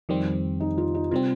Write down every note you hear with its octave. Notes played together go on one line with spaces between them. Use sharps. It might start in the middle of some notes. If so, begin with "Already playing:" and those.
F2 D#3 G3 C4 G4
D#4
F4
D#4
C3 G3 C4 F4